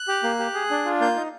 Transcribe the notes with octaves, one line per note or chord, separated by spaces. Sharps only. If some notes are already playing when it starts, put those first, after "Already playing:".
Already playing: F#6
G4
A#3
G4
G#4
D4
F4
A#3 G6
D#4